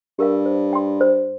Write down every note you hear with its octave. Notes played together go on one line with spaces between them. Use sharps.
G2 G4 A#4 F5
C5
G5 C6
C5